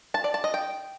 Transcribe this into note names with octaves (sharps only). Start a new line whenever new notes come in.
A5
D5
A5
D#5
G5